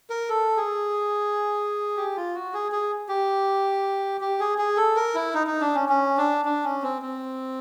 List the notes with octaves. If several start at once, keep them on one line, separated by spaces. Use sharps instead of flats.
A#4
A4
G#4
G4
F4
F#4
G#4
G#4
G4
G4
G#4
G#4
A4
A#4
E4
D#4
D#4
D4
C#4
C#4
D4
D4
C#4
C4
C4